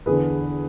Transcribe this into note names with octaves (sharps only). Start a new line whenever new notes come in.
E2 D3 G#4 B4